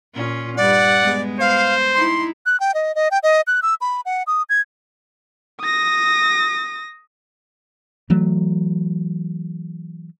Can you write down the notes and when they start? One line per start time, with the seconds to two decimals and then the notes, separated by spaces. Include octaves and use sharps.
0.14 A#2 C#4 F4
0.57 G2 G3 D5 F#5
1.03 G#3 B3
1.40 C5 F5
1.94 D#4 E4 C6
2.46 F#6
2.60 G5
2.74 D#5
2.95 D#5
3.11 G5
3.23 D#5
3.47 F#6
3.63 E6
3.81 B5
4.06 F#5
4.27 D#6
4.49 G#6
5.61 D#6 A#6
8.10 E3 F#3 A3